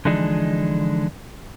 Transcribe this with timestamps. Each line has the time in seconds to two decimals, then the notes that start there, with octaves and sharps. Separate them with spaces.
0.05 D3 E3 F3 G#3 D4 D#4